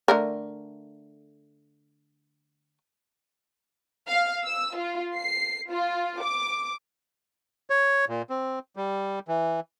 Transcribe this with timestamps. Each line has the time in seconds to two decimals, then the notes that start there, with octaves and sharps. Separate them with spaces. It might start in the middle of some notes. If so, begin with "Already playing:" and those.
0.08 D3 A3 A#4
4.07 F5
4.45 E6
4.76 F4
5.17 C7
5.70 F4
6.21 D6
7.70 C#5
8.09 A#2
8.30 C4
8.76 G3
9.28 E3